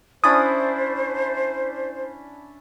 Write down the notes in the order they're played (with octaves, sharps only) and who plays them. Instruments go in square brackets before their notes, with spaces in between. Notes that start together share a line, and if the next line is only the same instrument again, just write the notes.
[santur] C#4 D4 E4 [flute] C5 [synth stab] D#6